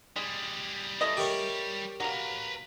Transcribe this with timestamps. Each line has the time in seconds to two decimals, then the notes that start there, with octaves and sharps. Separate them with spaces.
0.16 G3 G#3 G#4
1.01 A3 E4 D#5
1.17 G4 A#4 C#5
2.00 F#3 A#3 B4 A#5